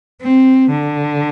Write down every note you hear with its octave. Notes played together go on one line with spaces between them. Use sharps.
C4
D3